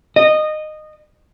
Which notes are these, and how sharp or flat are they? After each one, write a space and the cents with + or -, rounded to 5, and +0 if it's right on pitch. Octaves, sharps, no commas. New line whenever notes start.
D#5 -15